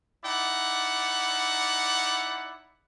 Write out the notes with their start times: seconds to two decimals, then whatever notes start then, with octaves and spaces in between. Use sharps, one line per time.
0.24 D#4 E4 D5 F#5